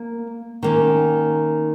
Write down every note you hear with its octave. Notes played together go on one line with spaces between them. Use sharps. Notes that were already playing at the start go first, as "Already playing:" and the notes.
Already playing: A#3
D#3 A#3 C#4